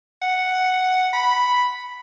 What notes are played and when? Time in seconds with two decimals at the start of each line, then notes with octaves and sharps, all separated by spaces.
0.22 F#5
1.13 B5